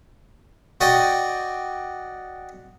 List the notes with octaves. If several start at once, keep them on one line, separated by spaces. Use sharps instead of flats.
F#4 D5 D#5 G5